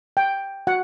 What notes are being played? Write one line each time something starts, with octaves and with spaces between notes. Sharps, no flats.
G5
F#4 F#5